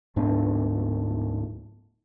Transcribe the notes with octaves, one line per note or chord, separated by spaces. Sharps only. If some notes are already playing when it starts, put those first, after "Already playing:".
D1 G#2 B3 D4